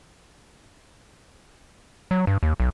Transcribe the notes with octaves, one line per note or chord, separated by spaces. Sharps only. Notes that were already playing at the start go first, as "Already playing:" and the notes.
F#3
G2
D#2
B1